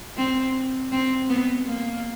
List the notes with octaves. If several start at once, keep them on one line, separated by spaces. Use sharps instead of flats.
C4
C4
B3
A#3